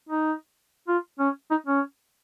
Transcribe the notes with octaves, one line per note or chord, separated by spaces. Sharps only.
D#4
F4
C#4
D#4
C#4